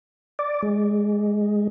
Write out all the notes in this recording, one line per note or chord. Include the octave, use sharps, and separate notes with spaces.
D5
G#3